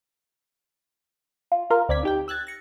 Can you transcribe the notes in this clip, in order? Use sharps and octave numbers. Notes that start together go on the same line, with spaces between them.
F4
F4 A#4 F5
D2 C4 D5 G#6 B6
D#4 G4 G5
E6 F#6 G#6 A6
A#6 C#7